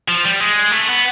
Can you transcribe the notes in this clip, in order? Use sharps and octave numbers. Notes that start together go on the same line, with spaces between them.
F3
G3
G#3
A3
B3